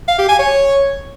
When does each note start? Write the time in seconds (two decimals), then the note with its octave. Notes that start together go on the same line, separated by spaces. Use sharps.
0.08 F5
0.18 G4
0.29 G#5
0.39 C#5